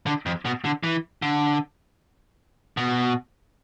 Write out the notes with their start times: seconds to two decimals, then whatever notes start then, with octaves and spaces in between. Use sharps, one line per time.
0.06 D3
0.26 F2
0.45 B2
0.65 D3
0.83 E3
1.22 D3
2.77 B2